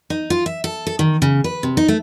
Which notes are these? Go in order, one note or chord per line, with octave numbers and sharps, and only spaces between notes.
D#4
F4
E5
A4
A4
D#3
C#3
B4
C3
D#4
A3